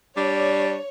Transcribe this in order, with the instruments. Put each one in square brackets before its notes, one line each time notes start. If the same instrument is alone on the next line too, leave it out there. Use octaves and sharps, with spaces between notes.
[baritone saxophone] G3 [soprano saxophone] D4 [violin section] C#5